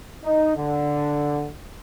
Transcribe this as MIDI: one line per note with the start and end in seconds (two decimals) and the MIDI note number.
0.24 0.54 63
0.56 1.47 50